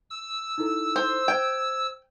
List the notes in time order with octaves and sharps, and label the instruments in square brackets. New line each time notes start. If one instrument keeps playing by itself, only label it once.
[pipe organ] E6
[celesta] D#4 E4 A4
[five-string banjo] C5
[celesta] C5 G#6 [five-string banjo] G5